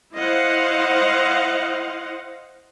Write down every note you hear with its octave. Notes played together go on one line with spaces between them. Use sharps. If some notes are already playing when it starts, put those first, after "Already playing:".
E4 C5 D#5 F5 F#5